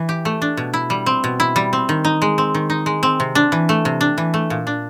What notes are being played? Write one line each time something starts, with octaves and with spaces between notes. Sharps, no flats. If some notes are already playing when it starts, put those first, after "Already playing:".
Already playing: E3
G4
A3
D4
B2
E4
G3
C4
B2
E4
G3
C4
D#3
D#4
G#3
C4
D#3
D#4
G#3
C4
C3
D4
E3
A3
C3
D4
E3
A3
A#2
D4